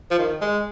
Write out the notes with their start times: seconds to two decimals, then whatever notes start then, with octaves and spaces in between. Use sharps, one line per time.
0.11 F3
0.19 D#3
0.41 G#3